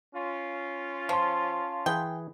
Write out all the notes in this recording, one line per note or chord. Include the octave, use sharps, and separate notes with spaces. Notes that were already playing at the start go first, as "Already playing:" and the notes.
C#4 F4
F3 F5 A5 C6
E3 G#4 B4 G5